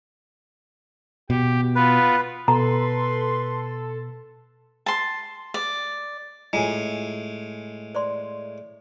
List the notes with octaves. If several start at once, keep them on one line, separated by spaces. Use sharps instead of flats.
B2 G4
B3 F4 B4
B2 A4 B4 A#5 C6
A5 C6
D5
A2 G#3 F4 G#5
C5 D5 C6